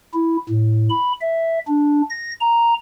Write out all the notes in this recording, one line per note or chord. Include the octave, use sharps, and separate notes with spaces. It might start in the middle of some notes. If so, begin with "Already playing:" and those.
E4
A2
B5
E5
D4
A#6
A#5